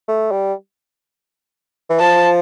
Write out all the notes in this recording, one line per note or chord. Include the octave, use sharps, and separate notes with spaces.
A3
G3
E3
F3 A5